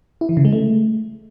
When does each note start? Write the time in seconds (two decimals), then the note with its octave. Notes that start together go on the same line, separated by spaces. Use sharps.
0.21 E4
0.29 E3
0.37 C#3
0.45 G#3
0.53 A3